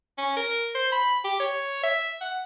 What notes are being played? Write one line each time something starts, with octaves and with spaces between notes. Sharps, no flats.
C#4
A#4
C5
B5
G4
C#5
E5
F#5